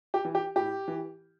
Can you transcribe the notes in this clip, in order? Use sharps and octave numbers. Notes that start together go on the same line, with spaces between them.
G4
E3
G4
A2 G4
E3